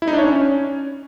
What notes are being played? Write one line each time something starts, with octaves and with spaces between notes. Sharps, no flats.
E4
D#4
D4
C#5
C#4